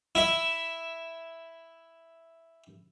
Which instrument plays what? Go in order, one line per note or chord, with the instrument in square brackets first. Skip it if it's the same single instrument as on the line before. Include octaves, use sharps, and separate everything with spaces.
[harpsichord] E4 E5